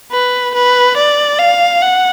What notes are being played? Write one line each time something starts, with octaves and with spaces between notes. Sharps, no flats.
B4
B4
D5
F5
F#5